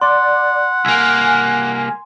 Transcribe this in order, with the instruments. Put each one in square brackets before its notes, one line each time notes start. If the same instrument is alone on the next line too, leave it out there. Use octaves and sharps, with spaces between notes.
[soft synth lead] D5 [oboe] F#5 [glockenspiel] C6
[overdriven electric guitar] C2 A#3 [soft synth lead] G#5